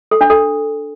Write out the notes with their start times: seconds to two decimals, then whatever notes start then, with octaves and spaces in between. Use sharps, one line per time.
0.11 A4
0.21 D4
0.30 A4